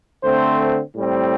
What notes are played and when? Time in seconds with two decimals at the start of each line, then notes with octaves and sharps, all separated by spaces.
0.23 D3 A3 C4 C5
0.95 A2 G3 C4